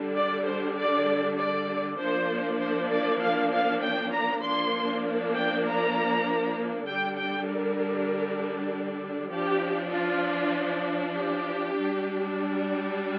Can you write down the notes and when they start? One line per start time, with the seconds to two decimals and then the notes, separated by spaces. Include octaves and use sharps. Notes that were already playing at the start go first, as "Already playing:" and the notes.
Already playing: D3 G3 D4
0.16 D5
0.46 C5
0.76 D5
1.37 D5
1.98 F3 A#3 D4 C5
2.59 C5
2.90 D5
3.20 F5
3.51 F5
3.81 G5
4.12 A#5
4.42 F3 A#3 D4 C6
5.34 G5
5.64 A#5
6.86 D3 G3 D4 G5
7.17 G5
7.47 A#4
9.30 F3 D4 G4
9.91 F4
11.14 G4
11.75 G3 D4